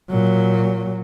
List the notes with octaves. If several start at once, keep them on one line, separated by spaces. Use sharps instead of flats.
A#2 F#3